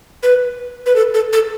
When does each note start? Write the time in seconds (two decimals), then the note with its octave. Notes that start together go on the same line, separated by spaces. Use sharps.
0.23 B4
0.86 B4
0.96 A4
1.14 A4
1.33 A4